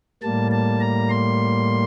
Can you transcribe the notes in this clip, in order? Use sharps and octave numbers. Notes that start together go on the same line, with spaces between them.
A2 G3 A#3 A5
A5
A#5
C6